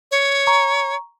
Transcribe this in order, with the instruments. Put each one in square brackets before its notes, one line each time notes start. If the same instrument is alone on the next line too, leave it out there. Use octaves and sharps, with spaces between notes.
[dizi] C#5
[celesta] A#5 C#6